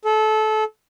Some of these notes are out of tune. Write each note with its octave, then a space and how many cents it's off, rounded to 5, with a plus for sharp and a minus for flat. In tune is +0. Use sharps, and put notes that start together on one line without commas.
A4 -25